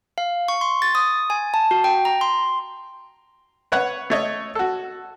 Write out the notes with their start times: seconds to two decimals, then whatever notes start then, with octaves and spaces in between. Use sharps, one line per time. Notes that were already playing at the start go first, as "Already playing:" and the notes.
0.18 F5
0.48 C#6
0.61 C6
0.82 A6
0.95 D#6
1.30 G#5
1.54 A5
1.71 F#4
1.84 G5
2.05 A#5
2.21 C6
3.72 B4 C#5 F#5
4.10 A3 C#5 D#5
4.55 F#4 A4